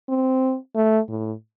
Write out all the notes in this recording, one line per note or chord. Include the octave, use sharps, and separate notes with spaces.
C4
A3
A2